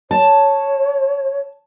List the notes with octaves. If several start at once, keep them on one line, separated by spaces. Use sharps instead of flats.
C#5 A5